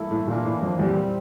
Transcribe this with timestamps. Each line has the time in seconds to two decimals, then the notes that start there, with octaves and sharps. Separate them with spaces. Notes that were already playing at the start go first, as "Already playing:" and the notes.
Already playing: G2 E3 A#3 E4 A4
0.11 A2
0.28 A#2 E3 A#3 D4
0.45 A2
0.62 F2
0.79 E2 A#2 G3 C4